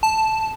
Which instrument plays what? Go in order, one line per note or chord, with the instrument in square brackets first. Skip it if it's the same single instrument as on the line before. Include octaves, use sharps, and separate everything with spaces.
[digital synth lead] A5